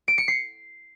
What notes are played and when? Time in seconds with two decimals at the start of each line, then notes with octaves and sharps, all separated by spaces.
0.08 D7
0.18 C#7
0.28 C7